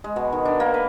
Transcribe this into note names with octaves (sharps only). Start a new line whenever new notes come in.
G#3
B2
D#3
D4
A#3
B4